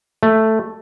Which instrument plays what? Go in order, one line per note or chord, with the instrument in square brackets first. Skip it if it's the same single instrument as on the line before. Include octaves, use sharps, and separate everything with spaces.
[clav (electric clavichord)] A3